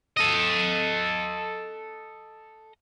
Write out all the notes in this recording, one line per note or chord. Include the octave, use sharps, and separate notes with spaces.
A4 D#5